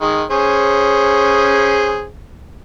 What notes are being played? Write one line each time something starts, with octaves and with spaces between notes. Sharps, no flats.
D#3 G#3
C#4 G#4 C5